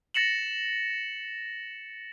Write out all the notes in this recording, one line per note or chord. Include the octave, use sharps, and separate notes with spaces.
A6 A#6 C#7 E7 F#7